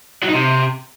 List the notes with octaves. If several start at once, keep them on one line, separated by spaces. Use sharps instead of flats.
F#3
D#4
C3